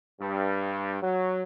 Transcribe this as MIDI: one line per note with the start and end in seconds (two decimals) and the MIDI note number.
0.21 0.98 43
1.02 1.42 54